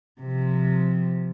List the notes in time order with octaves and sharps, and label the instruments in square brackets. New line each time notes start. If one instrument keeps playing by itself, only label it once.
[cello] C3 F3